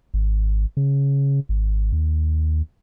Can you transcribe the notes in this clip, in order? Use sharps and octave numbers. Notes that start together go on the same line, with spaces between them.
G#1
C#3
G#1
D#2